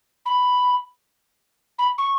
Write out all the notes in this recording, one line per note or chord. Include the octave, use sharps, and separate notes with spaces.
B5
B5
C#6